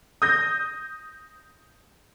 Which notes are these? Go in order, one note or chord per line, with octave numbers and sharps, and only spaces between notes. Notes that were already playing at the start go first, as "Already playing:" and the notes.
D#6 G6 A#6